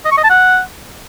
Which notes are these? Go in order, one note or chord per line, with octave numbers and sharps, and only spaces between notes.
D#5
C#6
D#5
A5
F#5